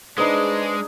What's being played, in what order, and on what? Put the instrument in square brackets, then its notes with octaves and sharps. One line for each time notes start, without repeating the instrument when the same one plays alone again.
[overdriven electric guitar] G#3 [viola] D4 [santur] D#4 G#4 [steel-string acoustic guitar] B4 C5